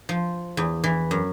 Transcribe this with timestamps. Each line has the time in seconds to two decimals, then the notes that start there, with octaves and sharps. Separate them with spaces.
0.09 F3
0.57 E2
0.84 E3
1.11 F#2